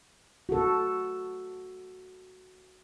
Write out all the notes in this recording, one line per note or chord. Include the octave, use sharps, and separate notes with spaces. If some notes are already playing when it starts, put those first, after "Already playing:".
F#4 A4